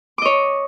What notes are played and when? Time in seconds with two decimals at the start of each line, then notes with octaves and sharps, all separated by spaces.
0.18 D6
0.22 D#5
0.25 C#5